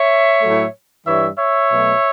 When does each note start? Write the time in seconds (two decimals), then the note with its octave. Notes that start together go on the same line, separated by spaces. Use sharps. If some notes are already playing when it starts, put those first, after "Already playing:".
Already playing: C#5 E5
0.42 A2 F#3 A3
1.06 G2 E3 G3 C#5 E5
1.39 C#5 E5
1.71 B2 F#3 A3